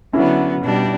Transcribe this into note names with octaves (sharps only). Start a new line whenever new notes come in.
D3 F#3 B3 C#4 E4
B2 G3 D4